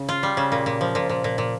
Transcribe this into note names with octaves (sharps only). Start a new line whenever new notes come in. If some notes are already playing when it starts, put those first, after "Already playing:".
Already playing: C#3
F4
G3
C#3
A#2
A#2
F3
A#2
A#2
A#2
A#2